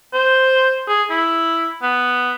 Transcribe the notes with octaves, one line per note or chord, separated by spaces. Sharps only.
C5
G#4
E4
B3